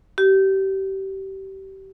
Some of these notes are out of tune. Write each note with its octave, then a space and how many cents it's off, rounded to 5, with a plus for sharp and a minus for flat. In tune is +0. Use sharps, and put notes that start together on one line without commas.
G4 -25